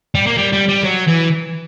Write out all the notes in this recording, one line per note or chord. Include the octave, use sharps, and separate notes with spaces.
G3
A#3
G3
G3
G3
F#3
E3